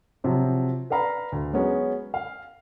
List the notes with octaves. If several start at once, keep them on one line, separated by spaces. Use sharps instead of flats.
C3 F3 F#3 C4
B4 D5 F5 A#5 B5
D2
F#3 G#3 B3 C#4
F5